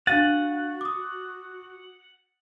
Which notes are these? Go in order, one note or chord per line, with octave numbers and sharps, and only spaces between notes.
D4 F#4 F5 F#5 A6 D#7
D6 D#6